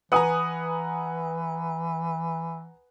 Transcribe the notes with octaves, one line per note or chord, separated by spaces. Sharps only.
E3 B4 F#5 G#5 A#5 D#6